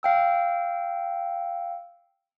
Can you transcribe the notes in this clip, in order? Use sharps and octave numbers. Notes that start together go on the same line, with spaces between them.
F5 G5 E6